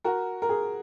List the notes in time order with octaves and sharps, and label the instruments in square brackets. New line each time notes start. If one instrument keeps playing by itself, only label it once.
[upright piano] F#4 A#4
A#4
G#4